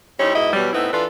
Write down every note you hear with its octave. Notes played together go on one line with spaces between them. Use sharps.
G3 C4 C#4 D#4 E4
G#2 B2 E4 G#4 D#5
B2 E3 F#3 G3
A2 B3 C4 D#4 E4
E3 D4 F4 A4 B4